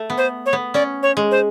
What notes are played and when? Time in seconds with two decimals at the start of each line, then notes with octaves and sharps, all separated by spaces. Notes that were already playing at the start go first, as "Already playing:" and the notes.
Already playing: A3
0.10 B3
0.18 C5
0.46 C#5
0.53 B3
0.74 C#4 D5
1.03 C#5
1.17 G#3
1.31 C5